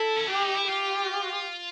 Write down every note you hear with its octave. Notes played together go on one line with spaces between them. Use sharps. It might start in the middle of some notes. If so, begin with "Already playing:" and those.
Already playing: E4 A4
C#4
D4 G4
D#4
E4
F4 G4